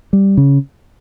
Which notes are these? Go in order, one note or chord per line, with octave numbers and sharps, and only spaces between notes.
G3
C#3